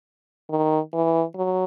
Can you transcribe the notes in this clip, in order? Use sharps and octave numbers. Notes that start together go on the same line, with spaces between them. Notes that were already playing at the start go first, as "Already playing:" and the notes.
D#3
E3
F#3